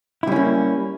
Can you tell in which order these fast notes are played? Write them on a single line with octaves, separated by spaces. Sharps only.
E4 G3 C#4 A#3